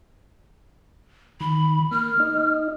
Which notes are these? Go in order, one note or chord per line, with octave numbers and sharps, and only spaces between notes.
D#3 B5
A#3 F6
D#4 D#5